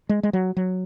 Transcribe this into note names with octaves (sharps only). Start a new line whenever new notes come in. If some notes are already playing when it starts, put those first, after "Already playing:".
G#3
G#3
F#3
F#3